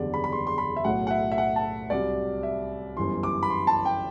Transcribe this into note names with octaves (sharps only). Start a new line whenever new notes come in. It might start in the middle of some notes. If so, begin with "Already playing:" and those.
Already playing: F#1 E2 D3 G3 D5
B5
B5
C6
C6
B5
E5
B1 A2 F#3 F#5
F#5
E5
E5
F#5
A5
C2 C3 F#3 D5
E5
G1 F#2 E3 G3 C6
D6
B5
C6
A5
G5